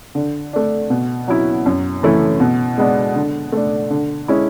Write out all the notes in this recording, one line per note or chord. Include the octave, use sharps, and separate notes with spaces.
D3
A3 D4
B2
F#3 C#4 E4
F#2
E3 A3 C#4 E4
B2
G#3 B3 D4
D3
A3 D4
D3
G#3 C#4 E4